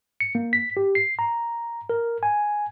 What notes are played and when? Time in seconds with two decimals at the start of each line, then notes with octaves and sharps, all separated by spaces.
0.20 C#7
0.35 A#3
0.53 B6
0.77 G4
0.95 C7
1.19 A#5
1.90 A#4
2.23 G#5